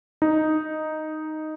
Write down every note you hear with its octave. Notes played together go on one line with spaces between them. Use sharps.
D#4